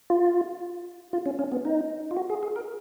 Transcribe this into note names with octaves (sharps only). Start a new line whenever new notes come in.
F4
F4
C#4
C#4
B3
D#4
F4
F#4
G#4
G#4
A#4